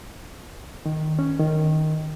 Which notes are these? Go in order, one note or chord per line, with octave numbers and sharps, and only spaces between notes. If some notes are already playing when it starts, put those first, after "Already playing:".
D#3
C#4
D#3